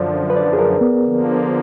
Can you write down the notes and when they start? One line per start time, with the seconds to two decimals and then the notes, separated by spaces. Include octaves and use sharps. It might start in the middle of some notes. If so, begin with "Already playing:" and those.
Already playing: F#2 D3 F3 D5
0.30 B4
0.36 D5
0.53 G#4
0.59 A#4
0.81 B3
1.03 D3 F3 A#3